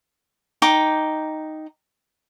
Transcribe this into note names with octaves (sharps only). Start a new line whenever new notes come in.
D#4 G5 D6